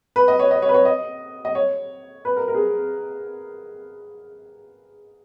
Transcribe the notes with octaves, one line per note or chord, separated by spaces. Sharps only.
B4
D#5
C#5
D#5
C#5
B4
C#5
D#5
D#5
C#5
B4
A#4
A#4
G#4